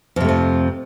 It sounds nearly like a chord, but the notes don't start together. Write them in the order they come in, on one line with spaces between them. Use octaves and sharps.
F2 C3 A3 F3